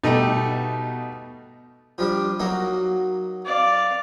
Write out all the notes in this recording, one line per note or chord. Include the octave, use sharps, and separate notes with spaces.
B2 G3 A3 D#4
F3 G3 D4
F#3 A#3 D#4
D5 F5